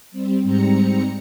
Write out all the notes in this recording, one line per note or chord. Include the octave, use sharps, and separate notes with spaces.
G3 C4
G#2 G3 C4 A#5 C#7